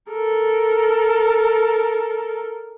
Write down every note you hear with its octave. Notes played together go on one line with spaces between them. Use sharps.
A4 A#4